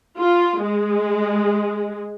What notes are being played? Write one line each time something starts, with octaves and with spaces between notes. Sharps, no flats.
F4
G#3